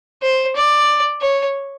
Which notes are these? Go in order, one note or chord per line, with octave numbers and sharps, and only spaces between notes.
C5
D5
C#5